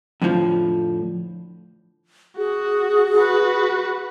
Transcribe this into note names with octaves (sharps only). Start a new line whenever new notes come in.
F2 A2 D3 D#3 F3
F#4 G#4
F#4 B4